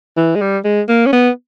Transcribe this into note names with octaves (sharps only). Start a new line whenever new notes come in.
E3
G#3
G3
G#3
A#3
C#4
B3